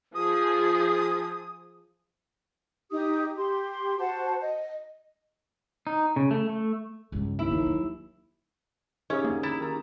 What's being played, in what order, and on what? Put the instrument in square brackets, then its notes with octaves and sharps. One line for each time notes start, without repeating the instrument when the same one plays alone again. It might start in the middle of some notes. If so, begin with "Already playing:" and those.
[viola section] F3 G#4 [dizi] D#6
[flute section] D#4 G4 D#6
G4 C6
F#4 C5 F#5 A5
D#5
[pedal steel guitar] D#4
C#3
A3
A3
[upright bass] C#2 G2
[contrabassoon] D#2 [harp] E4
[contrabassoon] D#2 [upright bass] E3
[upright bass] F#3
[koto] C#4 [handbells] D#4 G4 G#4 [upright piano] C#5 E5 D#6
[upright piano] D2 C4 [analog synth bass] A#3
[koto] E4 [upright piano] A#5 A6 E7
[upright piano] D#3 A#5